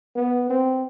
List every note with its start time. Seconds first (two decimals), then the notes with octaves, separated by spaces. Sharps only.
0.16 B3
0.50 C4